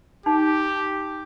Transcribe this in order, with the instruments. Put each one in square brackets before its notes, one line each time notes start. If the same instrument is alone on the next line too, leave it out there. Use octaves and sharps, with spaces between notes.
[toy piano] D#4 [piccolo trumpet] G4